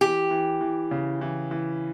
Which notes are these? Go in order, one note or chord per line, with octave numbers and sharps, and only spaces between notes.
E3 G4
E3
E3
C#3
E3
E3